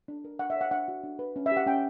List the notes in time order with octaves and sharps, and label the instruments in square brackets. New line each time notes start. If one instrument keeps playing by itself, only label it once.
[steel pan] D4
A#4
D4 F#5
E5
C#5
F#5
D4 F#5
F#4
D4
B4
C#4
E5
G4
F#5
C#4 G5